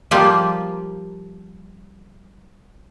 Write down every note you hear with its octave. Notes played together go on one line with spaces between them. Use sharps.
F3 G3 A#3 F4 G4